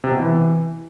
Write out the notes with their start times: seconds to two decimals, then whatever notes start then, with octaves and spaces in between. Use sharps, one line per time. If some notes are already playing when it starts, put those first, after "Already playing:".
0.04 C3
0.11 B2
0.19 E3